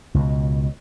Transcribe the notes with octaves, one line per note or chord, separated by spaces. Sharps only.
C#2 B2